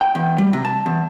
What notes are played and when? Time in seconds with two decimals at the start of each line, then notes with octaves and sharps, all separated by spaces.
0.01 G5
0.15 E2
0.38 G3
0.53 C3
0.65 A5
0.86 E2